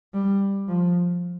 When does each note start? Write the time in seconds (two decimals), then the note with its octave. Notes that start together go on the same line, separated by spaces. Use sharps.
0.14 G3
0.68 F3